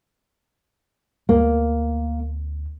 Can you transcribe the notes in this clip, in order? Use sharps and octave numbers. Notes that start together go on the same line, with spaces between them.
D2 A#3